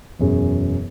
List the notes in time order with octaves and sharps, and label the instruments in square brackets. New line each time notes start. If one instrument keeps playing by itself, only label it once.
[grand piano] E1 F#2 G#4